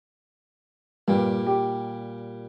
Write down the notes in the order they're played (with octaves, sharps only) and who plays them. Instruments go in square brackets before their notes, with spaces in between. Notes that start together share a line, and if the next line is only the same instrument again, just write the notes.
[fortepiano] G2 [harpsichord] A#2 G3
[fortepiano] G4